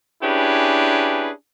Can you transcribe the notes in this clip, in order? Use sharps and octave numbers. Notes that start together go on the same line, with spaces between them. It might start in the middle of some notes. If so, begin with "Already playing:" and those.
C#4 D4 E4 G4 G#4 B4